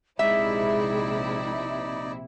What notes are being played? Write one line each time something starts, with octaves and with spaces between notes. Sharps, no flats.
A#1 C3 G#3 D#4 E4 D5 E5